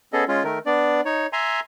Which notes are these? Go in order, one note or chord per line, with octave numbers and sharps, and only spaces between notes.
B3 C#4 G#4 A4 D#5
G#3 C#4 F4
D#3 A3 A#4
B3 D4 D5
D#4 C#5
E5 G#5 A#5 C6